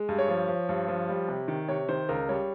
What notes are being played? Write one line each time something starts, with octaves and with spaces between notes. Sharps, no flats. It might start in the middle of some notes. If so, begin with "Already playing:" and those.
Already playing: G#3
G2
C#5
F3
F3
G2
F3
G3
C3
D#3
C3 C#5
D#3 C5
C#2 A#4
G3 C#5